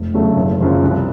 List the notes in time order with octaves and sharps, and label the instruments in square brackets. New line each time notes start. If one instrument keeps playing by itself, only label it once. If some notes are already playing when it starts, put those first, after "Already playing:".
Already playing: [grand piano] F1
E2 C#3 F#3 A3
F#1
F#2 C#3 F3
C2